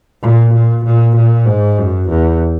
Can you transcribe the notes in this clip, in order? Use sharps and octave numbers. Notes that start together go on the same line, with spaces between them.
A#2
A#2
A#2
A#2
G#2
F#2
E2